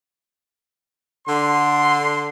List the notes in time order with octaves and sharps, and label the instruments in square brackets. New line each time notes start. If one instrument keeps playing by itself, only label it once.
[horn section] D3 C6